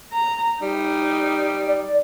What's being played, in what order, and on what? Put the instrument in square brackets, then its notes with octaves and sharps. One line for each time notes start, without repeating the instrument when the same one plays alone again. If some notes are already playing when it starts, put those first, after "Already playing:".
[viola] A#5
[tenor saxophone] G3 [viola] D#4
[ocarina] D5